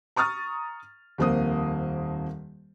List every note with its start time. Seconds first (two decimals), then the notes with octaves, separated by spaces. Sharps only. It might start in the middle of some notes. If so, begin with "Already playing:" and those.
0.16 A#5 C#6 D#6 F6 A6
1.18 D#1 F2 A#3 C5 D#6